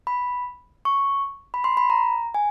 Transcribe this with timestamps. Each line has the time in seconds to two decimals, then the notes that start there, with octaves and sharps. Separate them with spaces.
0.07 B5
0.85 C#6
1.54 B5
1.64 C6
1.77 B5
1.90 A#5
2.35 G#5